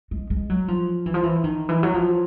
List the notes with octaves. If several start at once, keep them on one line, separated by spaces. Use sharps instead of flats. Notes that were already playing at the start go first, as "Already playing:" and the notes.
G#3
G#3
F#3
F3
E3
F3
E3
D#3
E3
F#3
F3